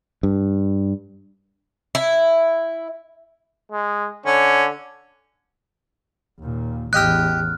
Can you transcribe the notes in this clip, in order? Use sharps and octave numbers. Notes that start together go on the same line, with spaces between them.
G2
E4
G#3
D3 C#4
D#2 A#2
A1 E2 G4 D#5 D6 F6 F#6